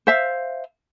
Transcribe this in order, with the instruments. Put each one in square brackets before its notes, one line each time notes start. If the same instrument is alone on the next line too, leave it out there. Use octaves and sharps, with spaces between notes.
[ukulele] C5 E5 F5